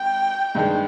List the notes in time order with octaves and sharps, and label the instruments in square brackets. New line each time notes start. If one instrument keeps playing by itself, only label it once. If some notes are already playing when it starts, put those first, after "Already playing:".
Already playing: [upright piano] G#1 [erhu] G5
[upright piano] G2 D#3 G#3